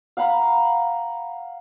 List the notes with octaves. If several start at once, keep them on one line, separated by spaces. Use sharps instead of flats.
F5 F#5 A#5 B5